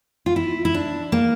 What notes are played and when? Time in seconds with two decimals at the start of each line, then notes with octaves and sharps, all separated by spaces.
0.26 F4
0.36 E4
0.65 E4
0.74 D4
1.12 A#3